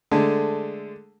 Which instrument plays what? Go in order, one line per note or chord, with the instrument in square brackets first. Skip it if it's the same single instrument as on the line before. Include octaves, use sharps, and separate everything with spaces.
[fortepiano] D3 G#3 A3